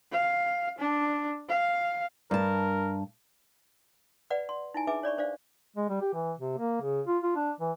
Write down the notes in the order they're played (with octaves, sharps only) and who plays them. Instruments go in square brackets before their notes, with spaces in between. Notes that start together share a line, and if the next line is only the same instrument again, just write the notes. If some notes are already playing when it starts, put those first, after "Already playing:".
[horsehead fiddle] F5
D4
F5
[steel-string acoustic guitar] G2 A5 [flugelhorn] A#4
[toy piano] B4 D5 F#5 B5
C6
D#4 E4 G#5
D4 G#4 B4 E5 G#5 D6
C#5 D5 B5 C#6
D4 C5 D5 F5
[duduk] G#3
G3
G4
E3
C3
A#3
C#3
F4
F4
D4
E3